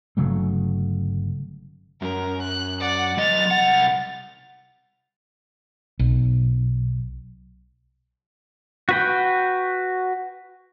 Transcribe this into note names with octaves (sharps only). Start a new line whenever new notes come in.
G1 C#3 F#3 A3
F#2 A#4
F#6
D5 F#5
F#3 D#5 A6 F7
C2 F#5
B1
F#4 B4 G5